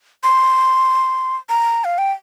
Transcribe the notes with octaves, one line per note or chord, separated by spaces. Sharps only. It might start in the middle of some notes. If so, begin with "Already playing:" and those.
C6
A#5
F5
G5